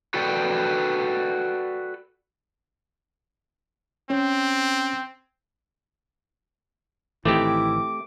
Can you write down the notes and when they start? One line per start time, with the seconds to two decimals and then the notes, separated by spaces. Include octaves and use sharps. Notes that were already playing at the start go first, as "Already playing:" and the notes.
0.14 F#4 A4 B4 D5 G5
4.10 C4 C#4
7.25 A1 D#3 E3 A3 C4 E4 G4 D6